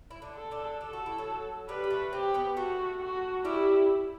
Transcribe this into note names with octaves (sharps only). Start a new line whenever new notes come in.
E4
D3 D4
A4
D3 D4
G4 A4
F#4
E4
F#3 F#4
G3 G4 B4
G4
A3 A4
C4 G4 C5
B3 B4
A3 F#4 A4
F#4
G3 E4 G4